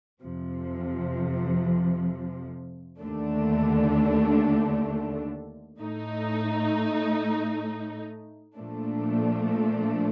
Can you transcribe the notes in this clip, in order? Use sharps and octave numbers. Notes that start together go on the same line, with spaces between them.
F2 C3 F3
D#2 D3 A3 D4
A2 A3 D#4
A#2 F3 A3 D4